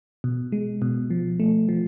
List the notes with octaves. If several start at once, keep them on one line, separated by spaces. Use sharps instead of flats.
B2
G#3
B2
F3
A3
F3